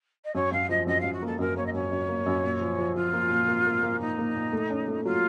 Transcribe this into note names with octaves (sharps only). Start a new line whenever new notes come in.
D#5
F#2 C#5
F#2 F5
F3 D#5
F#2 D#5
F#2 F5
F#4
A#3 A4
F#2 A#4
A#3 C#5
D#5
F#2 C#5
F#2
A#3
F#2
A#2
F3
F3
F3 F4
A#3
A#2
A#3
A#3
A#3
A#2 D#4
A#3
A#2
A3
C#4
A3
F#3 F4